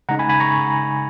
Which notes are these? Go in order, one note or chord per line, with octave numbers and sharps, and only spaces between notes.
C#3 G#3 D#4 F#5 A#5
G#5 B5
G#5 B5
A#5 C#6